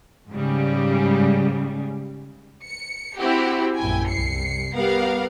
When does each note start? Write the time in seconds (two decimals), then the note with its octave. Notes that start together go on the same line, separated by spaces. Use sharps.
0.31 G#2 C#3 G3
2.65 C#7
3.18 C4 E4 F#4 G4
3.76 A#1 F#2 E4 G5 G#5
4.08 C2 C7 C#7
4.74 G3 B3 A#4 F5 F#5